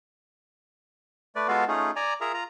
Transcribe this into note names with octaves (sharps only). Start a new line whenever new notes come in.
A3 B4 D5
G#3 B3 F4 F#4 A4 F5
A3 C#4 D#4 F4 G#4
D5 G#5 A#5
F4 G#4 A#4 E5 A#5
F4 A#5